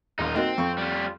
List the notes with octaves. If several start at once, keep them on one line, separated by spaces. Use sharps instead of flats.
D#1 D#4 F4
A#3 C4 D#4 F#4
F2 F3 C#6
G3 F4